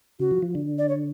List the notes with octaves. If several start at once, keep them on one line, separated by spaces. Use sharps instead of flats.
C#3 F#4
F3
F3
D3
D5
C#5